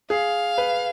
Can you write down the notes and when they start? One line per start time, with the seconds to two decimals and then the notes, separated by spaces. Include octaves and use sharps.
0.10 G#4 F5
0.58 B4